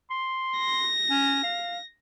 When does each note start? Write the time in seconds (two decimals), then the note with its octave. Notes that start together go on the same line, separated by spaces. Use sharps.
0.10 C6
0.58 A#6
1.10 C#4
1.43 F5